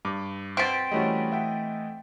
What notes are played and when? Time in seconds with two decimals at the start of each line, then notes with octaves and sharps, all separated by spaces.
0.05 G2 D6
0.57 B2 C4 A6 B6 D7
0.91 E3 G3 A3 C#4 F#4 D#5
1.32 E5 F#5 G5